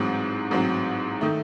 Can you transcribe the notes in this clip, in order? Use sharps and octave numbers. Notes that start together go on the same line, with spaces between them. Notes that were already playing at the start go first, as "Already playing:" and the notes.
Already playing: A1 G#2 F#3 C4
A1 G#2 F#3 C4
D#3 A3